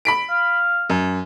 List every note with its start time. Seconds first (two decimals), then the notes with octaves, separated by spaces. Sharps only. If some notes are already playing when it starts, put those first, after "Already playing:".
0.05 B5 B6 D7
0.30 F5
0.90 F#2